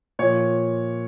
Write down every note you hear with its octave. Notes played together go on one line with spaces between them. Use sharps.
A#2 F3 C#5